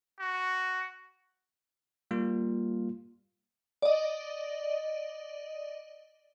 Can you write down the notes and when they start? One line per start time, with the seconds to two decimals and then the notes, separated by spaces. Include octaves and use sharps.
0.19 F#4
2.11 G3 A#3 F4
3.82 D5 D#5